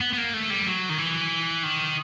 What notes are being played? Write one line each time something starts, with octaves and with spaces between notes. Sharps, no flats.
B3
B3
A#3
A3
G3
F#3
D#3
E3
D#3